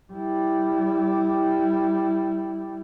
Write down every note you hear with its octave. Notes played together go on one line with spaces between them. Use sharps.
G3 E4